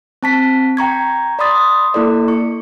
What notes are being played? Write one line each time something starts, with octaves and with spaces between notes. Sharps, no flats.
C4 A5 B6
G5 A#5 C#6 G#6
D5 B5 C6 D#6 A6
A#3 E4 A4 D5
C#6